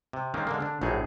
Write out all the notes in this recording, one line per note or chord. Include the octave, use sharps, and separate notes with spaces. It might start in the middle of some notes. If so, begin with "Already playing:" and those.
C3
D#3 G#3 A#3 C4 C#4
D3 G#3 A#3
D3 D4
A#1 A2 F#3 D#4 G#4